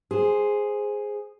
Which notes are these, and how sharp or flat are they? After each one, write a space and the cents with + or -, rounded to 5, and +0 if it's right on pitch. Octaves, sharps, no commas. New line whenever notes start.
G#4 +0 C5 +0